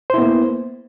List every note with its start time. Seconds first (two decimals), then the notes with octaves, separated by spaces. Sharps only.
0.10 C5
0.14 E4
0.18 B3
0.22 A#3